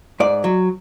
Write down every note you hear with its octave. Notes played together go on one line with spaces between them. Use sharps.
G#2 D5
F#3